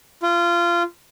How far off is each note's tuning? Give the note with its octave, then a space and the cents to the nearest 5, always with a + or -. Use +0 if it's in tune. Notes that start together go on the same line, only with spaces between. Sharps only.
F4 -20